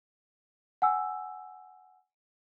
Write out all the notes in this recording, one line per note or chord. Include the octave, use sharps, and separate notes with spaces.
F#5 G#5 E6